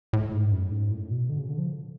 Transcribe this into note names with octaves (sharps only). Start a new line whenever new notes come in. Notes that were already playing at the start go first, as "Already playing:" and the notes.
A2
G#2
F#2
G#2
A2
B2
D3
C#3
D3
F3